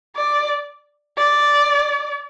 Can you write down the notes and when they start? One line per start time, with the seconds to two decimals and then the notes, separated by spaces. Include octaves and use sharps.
0.16 D5
1.17 D5